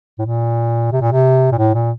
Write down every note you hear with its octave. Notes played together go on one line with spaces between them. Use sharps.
A2
A#2
C3
A#2
C3
A#2
A2
A#2